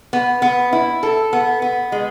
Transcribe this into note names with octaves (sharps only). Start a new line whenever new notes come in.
B3
B3
E4
A4
B3
B3
G#3